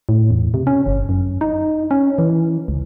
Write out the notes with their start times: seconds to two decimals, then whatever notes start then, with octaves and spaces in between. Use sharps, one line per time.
0.09 A2
0.30 E2
0.54 C3
0.67 C#4
0.86 G1
1.09 F#2
1.41 D#4
1.91 C#4
2.18 E3
2.68 C#2